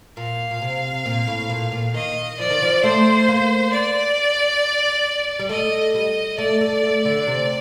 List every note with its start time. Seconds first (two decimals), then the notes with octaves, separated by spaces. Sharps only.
0.17 A#2 F5
0.51 A#2
0.62 C3
1.06 A#2
1.28 A2
1.50 A#2
1.72 A#2
1.94 D#3 D#5
2.39 F3 D5
2.50 D#3
2.62 F3
2.83 A3 C5
3.28 A#3
3.72 D5
5.39 G3
5.49 A3 D#5
5.94 G3 D#5
6.38 A3 D5
6.61 A3
6.83 A3
7.05 D3
7.27 C3